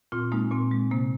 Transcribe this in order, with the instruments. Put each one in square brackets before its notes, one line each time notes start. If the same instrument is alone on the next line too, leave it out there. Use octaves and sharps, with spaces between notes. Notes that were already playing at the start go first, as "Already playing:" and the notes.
[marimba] A#2 C4 F4
G#3 A#3 D#4
A#2 C4
G#3
C3 A#3